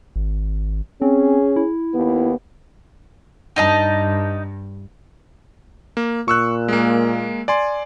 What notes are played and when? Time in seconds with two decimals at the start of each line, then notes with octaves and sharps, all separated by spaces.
0.16 G#1
1.02 C4 C#4 G#4
1.56 E4
1.94 D#2 B3
3.56 G2 D#4 D#5 A5
5.97 A#3
6.28 A#2 C#6 E6 F#6
6.68 G#3 A#3
7.48 D5 G#5 C6